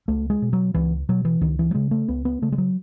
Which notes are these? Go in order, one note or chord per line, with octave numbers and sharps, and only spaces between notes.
C#2 A3
G#3
B2
F#3
C#2 E3
B2 F#3
E3
C#2 D#3
E3
F#3
C#3 G#3
A3
C#2 B3
B3
C#3 A3
G#3
F#3